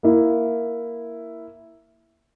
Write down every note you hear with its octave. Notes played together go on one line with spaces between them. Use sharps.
A#3 E4